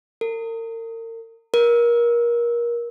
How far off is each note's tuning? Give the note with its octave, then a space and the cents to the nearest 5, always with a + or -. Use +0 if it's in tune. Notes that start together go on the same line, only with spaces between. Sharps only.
A#4 -40
A#4 +25